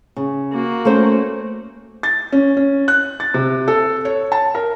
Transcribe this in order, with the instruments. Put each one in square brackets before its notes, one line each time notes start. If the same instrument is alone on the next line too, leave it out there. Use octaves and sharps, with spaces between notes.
[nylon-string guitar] C#3
[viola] A#3 F#4
[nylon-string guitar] A3 C#4 C5
[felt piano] A6
C#4
C#4
F#6
A6
C3
A4
C#5
A5
A#4